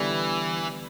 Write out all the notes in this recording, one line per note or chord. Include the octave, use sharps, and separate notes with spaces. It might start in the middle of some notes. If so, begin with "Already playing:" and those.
Already playing: D3 E3 G3 B3